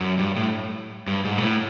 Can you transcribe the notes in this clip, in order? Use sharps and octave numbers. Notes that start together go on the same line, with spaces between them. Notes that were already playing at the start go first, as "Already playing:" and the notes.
F#2
G2
A2
G2
G#2
A#2
A2